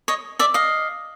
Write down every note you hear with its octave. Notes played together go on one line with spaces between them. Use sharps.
C#5 D#5
D5 E5
D#5 F5